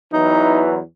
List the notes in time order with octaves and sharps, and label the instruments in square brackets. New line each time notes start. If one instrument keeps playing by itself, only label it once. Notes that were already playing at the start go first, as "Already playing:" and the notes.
[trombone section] E2 E3 F#3 [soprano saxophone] D#4